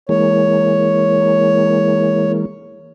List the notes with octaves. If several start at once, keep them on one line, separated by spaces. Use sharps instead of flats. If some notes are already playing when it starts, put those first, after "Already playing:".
E3 G#3 A#3 C#5